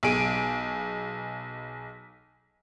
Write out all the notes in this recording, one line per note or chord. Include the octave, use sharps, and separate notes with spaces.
B1 G#4 D7 D#7